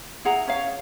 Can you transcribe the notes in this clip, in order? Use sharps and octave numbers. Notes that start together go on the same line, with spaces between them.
E4 G#4 F#5 A#5
C#4 C#5 F5